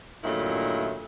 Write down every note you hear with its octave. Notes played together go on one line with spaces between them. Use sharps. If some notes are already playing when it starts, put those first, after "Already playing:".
G2 A#2 D#3 F#3 A3 E4